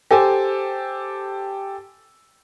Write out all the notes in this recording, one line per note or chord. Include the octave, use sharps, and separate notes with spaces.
G4 A4 C5 G#5